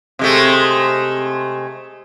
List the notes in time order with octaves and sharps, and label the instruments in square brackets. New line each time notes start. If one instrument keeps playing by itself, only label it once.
[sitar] C3 G#3 A3